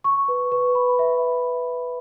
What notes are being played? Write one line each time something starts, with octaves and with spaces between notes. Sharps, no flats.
C#6
B4
B4
B5
E5